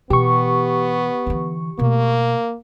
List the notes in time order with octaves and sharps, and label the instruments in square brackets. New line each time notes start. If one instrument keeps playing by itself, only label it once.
[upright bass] B2 E3 [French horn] B3 [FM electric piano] G4 C#6
[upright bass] D3 E3
[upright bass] B2 A3 [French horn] A#3